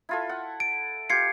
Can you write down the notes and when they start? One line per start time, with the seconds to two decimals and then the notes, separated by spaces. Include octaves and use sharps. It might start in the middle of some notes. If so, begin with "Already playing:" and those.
0.09 E4 F4 A4
0.29 F#5
0.60 D7
1.10 F4 G4 G#6 C7 C#7